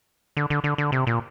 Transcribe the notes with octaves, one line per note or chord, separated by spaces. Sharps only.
D3
D3
D3
D3
C3
A#2